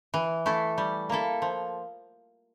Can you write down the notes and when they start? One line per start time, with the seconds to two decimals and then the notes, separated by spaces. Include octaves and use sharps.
0.14 E3
0.46 A3 E4 A4
0.78 G3
1.09 A#3 E4 A4
1.42 F3